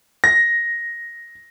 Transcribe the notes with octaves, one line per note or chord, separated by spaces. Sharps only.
A#6